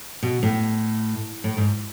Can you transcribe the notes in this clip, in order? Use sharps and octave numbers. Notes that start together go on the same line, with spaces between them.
B2
A2
A2
G#2